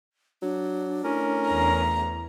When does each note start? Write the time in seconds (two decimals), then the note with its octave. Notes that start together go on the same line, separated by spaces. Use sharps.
0.42 F#3 D4
1.04 A2 C#4 A#4
1.46 E2 A#5